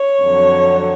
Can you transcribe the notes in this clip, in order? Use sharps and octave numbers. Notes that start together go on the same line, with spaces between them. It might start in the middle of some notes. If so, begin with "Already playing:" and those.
Already playing: C#5
F2 D3 F#3